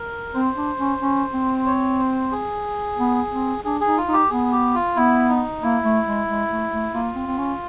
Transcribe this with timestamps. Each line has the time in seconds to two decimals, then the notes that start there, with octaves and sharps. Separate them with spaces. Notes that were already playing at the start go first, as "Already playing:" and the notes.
Already playing: A#4
0.34 C4 C5
0.56 D4
0.78 C#4
1.01 C#4
1.32 C4
1.66 C#5
1.99 C5
2.31 G#4
2.98 B3
3.31 C4
3.64 D4 G#4
3.81 D#4 G#4
3.98 F4
4.08 D#4 G4
4.30 B3 G#4
4.52 G4
4.75 F4
4.96 B3 E4
5.29 D#4
5.62 A#3 E4
5.84 A3
6.07 G#3
6.29 G#3
6.50 A3
6.72 A3
6.94 A#3 F4
7.16 C4
7.27 C4
7.38 C#4